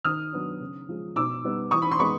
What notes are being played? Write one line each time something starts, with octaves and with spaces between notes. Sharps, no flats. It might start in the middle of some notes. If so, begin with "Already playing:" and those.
D#3 D#6 F6
F#3 B3 D4
C#3
F3 G#3
B2 D6 E6
G3 B3 D#4
E3 C#6 D#6
B5
C6
G#3 B3 D#4 B5 C#6